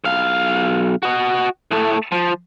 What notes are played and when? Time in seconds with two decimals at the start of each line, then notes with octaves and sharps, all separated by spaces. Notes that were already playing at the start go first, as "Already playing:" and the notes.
0.04 B1 F5
1.03 F#4 D#5
1.71 A2 A3
2.12 F3